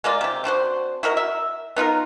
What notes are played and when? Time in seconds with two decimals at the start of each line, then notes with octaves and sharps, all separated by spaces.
0.04 G#3 A#3 F4 D5
0.21 C3 G4
0.44 C4 D4 F#4 C5
1.03 E4 F#4 A#4 D#5
1.17 E5
1.76 B3 D#4 F4 A#4